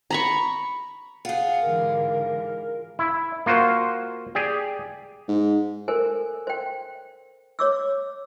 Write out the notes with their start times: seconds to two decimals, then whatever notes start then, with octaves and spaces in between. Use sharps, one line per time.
0.10 A#5 B5 C#6
1.25 F4 G#4 F#5
1.62 G#2 D3 E3 A#4
2.99 E4
3.46 A#3 F4 F#4 C5
4.35 G4 G#4 D5
5.28 G#2
5.88 A4 A#4 C5 G#5
6.47 C5 G5
7.59 C#5 D6 E6